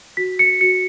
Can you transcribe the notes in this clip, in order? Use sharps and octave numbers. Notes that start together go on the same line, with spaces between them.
F#4 B6
C#7
F#4 C#7